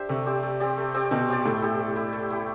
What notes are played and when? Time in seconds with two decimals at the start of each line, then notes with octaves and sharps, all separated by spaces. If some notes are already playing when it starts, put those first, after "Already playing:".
Already playing: D4 G4 C5 E5
0.09 C3 A3
0.26 C4 G4 D5
0.43 A3
0.60 C4 G4 D5
0.77 A3
0.94 C4 G4 D5
1.11 B2 A3
1.29 C4 G4 D5
1.45 A2 A3
1.62 E4 G4
1.79 A3
1.96 E4 G4
2.13 A3
2.30 E4 G4